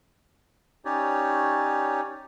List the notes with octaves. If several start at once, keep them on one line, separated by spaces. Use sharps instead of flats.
C#4 D#4 G4 C#5 D5